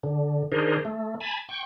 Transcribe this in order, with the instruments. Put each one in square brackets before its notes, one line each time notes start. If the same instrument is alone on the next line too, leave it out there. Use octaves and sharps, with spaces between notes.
[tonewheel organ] D3
D#3 D4 G#4 A#4 C5
A3
G#5 A5 B5
G5 C#6